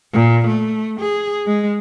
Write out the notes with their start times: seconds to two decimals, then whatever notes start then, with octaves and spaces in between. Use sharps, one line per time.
0.13 A#2
0.47 A3
1.00 G#4
1.46 G#3